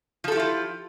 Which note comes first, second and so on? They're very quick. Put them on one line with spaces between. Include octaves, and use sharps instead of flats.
F3 A4 G4 E4 F4